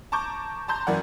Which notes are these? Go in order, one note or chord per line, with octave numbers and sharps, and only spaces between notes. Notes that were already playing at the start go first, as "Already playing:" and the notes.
A5 A#5 C#6 D6 G6
A5 A#5 C6 G6
F#2 E3 A#3 D5 F#5